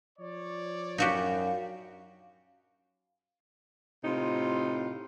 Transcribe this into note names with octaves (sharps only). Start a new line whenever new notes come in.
F3 C#5 D5
F#2 D#4 F#4 G4 F5
A2 C3 D#4 F4